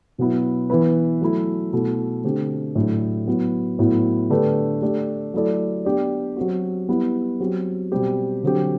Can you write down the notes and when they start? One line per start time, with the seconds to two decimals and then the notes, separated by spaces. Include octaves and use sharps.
0.18 B2 F#3 B3 E4
0.70 E3 B3 E4 B4
1.21 F#3 A3 E4
1.73 B2 A3 E4
2.24 D3 A3 C4 G4
2.75 A2 F#3 A3 D4 A4
3.27 F#3 B3 E4
3.79 A2 F#3 B3 E4
4.30 D3 A3 D4 G4 B4
4.82 A3 D4 G4
5.34 F#3 A3 E4 A4 D5
5.85 B3 D4 G4 D5
6.36 F#3 C4 F#4
6.89 G3 B3 E4
7.40 F#3 C4 G4
7.92 B2 G3 C4 G4
8.43 D3 F#3 C4 G4